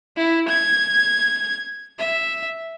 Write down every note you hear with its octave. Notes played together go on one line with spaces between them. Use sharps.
E4
G#6
E5